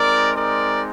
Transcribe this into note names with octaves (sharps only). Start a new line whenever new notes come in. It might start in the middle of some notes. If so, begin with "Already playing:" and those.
Already playing: G#3 C4 D#4 A#4 D5
A#4 D5